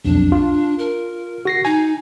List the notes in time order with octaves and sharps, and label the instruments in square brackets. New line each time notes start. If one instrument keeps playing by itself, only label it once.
[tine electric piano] B1 F2 [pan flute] D4
[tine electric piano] F4
[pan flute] A#4
[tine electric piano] F#4 A#6 C7
[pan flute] D#4 [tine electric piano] G#5